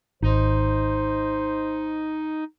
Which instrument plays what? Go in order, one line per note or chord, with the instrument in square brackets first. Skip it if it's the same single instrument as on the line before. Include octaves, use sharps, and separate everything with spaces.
[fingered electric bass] G#1 [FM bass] D#4 [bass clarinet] C5